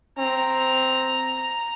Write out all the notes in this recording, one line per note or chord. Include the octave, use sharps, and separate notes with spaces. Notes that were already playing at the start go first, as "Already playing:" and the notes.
C4 A#5